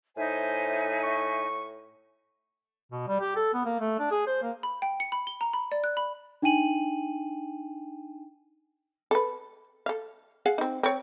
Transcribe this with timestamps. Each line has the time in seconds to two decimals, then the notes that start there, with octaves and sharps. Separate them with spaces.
0.17 A2 D#4 C5 E5 G#5
1.03 C#6
2.92 B2
3.08 G3
3.20 G4
3.36 A4
3.54 B3
3.65 A#3
3.80 A3
3.99 D4
4.11 G#4
4.27 C5
4.43 A#3
4.63 B5
4.82 G5
5.00 C#7
5.12 B5
5.27 G7
5.41 A#5
5.53 B5
5.72 D5
5.84 F#6
5.97 B5
6.42 D4 D#4 G5 G#5 D#7 F#7
9.11 A4 B4
9.86 A4 F5
10.46 G#4 F5 F#5
10.58 C4 D#4
10.83 C4 C#5